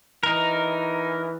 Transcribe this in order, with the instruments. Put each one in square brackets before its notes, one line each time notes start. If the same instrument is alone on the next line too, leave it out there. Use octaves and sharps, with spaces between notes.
[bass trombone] E3 [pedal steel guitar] D#4 A#4